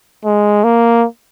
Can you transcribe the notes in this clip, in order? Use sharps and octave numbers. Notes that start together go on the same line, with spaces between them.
G#3
A#3